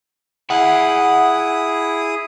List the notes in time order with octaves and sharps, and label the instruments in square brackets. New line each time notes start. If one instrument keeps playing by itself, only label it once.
[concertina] E4 G#4 D#6 [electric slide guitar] E5 F#5